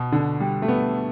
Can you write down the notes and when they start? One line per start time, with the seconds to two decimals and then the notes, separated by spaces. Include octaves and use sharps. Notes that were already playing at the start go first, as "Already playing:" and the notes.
Already playing: B2
0.12 D3
0.40 G3
0.62 A3
0.68 B3